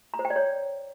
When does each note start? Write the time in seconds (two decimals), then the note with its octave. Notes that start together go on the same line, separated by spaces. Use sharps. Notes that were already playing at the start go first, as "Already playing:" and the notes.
0.14 A#5
0.19 C5
0.25 G5
0.30 D5
0.36 C#5